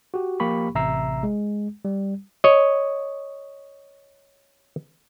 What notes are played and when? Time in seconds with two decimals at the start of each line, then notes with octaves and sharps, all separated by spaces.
0.14 F#4 G4
0.40 F3 A#3 G4 B5 C#6
0.75 A1 C3 E5 A#5 E6 C7
1.23 G#3
1.85 G3
2.44 C#5 D#5